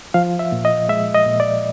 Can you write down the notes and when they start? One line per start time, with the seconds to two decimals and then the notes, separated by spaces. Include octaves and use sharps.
0.14 F3 F5
0.39 E5
0.52 A#2
0.65 D#5
0.89 G#3 E5
1.14 D#5
1.26 A#2
1.40 D5